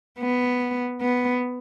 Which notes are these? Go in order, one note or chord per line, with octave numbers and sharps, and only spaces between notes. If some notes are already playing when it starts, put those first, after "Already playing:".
B3
B3